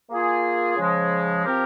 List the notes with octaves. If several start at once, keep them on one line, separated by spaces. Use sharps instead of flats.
A#3 F4 G#4
C#3 F3 G#3
F3 C4 G4 A#4